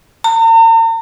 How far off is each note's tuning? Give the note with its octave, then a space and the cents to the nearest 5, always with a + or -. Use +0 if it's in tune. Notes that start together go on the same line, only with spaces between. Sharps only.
A#5 -45